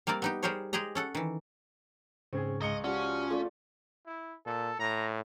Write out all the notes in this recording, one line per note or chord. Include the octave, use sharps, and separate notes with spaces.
G3 A#3 C4 A#4 D5
B3 D#4 G4
G3 G4 G#4 A#4 C5 C#5
G#3 G4 G#4 D#5 A#5
C#4 A4 F#5
D#3 E3
G#2 C#3 C4 C#4 G#4 C#6
C#2 D#5 C#7 G7
F3 C#4 F#4 G4 D5
A3 F4 D5
E4
A#2 A4
A2 A#5